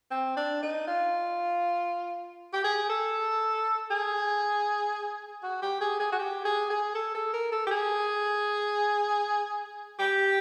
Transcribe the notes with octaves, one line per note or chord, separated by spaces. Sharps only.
C4
D4
D#4
F4
G4
G#4
A4
G#4
F#4
G4
G#4
G#4
F#4
G4
G#4
G#4
A4
A4
A#4
A4
G4
G#4
G4